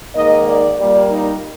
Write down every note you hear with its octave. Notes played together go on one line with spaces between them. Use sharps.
G#2 D#3 A#3 D#5
D5
A#2 G3 A#3 D5
D#4